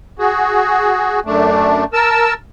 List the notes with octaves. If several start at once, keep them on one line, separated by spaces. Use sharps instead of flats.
F#4 G#4
F#2 A3 D4
A#4 A5 E6